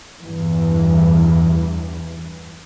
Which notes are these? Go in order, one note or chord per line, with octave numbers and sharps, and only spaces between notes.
E2 G2 E3